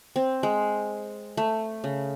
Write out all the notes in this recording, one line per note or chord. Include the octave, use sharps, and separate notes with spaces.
C4
G#3
A3
C#3